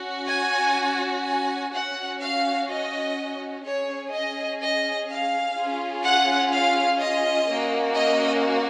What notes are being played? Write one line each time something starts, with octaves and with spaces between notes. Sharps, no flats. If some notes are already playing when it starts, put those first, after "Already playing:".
Already playing: C#4 F#4
G#5
G#5
C#4 F#4 F#5
F5
D#5
C#4 G#4 C#5
D#5
D#5
F5
C#4 F4 G#4
F#5
F5
D#5
A#3 C#4 F#4
D#5